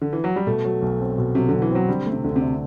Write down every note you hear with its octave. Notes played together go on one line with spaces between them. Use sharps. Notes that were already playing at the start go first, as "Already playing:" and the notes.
D3
E3
F#3
G3
B2 A3
F#3
B1
C4
B2
C3 F#3
B1 D3
E3
F#3 C4
D3 G3
A3
C3
D2 D3
C3
D4